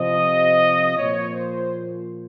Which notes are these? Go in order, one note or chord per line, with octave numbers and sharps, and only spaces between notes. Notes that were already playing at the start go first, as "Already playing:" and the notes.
Already playing: C3 F3 D#5
A#2 F3 C#5
C5